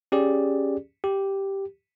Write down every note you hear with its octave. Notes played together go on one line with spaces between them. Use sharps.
C#4 G4 G#4 D5
G4